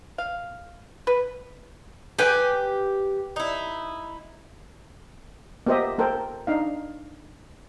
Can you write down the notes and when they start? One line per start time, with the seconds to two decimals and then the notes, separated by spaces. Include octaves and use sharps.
0.18 F5
1.07 B4
2.19 G4 B4 G5 G#5
3.36 D#4 E4
5.66 A#3 B3 G4 C5 D#5 E5
5.98 A#3 A4 A#4 C5 G5
6.47 D4 D#4 F5